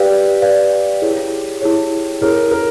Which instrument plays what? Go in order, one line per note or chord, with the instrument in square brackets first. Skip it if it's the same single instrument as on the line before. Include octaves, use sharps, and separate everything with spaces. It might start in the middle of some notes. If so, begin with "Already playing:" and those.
Already playing: [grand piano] G4 [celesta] B4 D5 F5
[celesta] B4 D5 F5
E4 G#4 C#5
E4 G#4 C#5
[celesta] E4 G#4 C#5 [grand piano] A#4
[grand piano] A#4